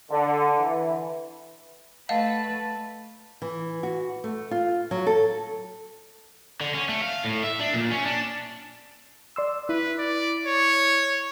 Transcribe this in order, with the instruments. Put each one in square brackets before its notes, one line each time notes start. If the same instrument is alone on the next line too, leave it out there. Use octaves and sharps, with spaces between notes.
[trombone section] D3
E3
[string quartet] A3 B4 [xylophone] D#5 F5 F#5 [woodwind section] A5
[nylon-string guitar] E3
F#4
A3
F4
F#3
A4
[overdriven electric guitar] D3
C#4
A3
F5
A2
E5
D4
A#2
C#4
D4
[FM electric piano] D5 C6 E6
[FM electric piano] E4 [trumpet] B4
[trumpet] D5
C#5